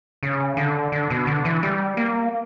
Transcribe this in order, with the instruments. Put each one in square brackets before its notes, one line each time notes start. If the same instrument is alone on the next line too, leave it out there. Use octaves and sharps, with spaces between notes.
[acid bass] C#3
D3
D3
B2
D3
E3
G3
A#3